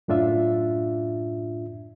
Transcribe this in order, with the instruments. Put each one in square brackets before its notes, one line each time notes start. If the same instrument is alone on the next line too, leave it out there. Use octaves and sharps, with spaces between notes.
[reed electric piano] F#2 A2 D4 F4 E5